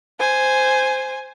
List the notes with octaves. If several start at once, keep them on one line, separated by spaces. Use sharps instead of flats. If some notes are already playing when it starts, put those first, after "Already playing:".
C5 G#5